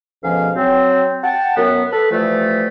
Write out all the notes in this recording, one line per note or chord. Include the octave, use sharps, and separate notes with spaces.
D2 G#2 B2 F3 C#4 F5
F#3 C4
F#5 G5 A5
F#2 B3
A4 B4
E3 F3 G3 A3